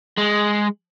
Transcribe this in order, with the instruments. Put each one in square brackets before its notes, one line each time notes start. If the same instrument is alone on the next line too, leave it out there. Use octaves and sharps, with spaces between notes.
[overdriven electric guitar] G#3